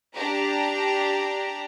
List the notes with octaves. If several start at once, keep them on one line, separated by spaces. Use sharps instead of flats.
D4 G4 A#5